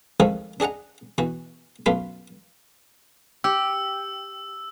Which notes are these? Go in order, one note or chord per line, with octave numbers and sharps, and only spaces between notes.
F2 G#2 D#3 F3 A3 D#6
D4 G#4 D#5 F#5 A#5
B2 E3 F#4
F#2 B2 A3 F4 F5 B5
G4 E6